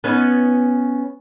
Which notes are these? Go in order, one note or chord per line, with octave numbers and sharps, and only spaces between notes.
B3 C#4 D#4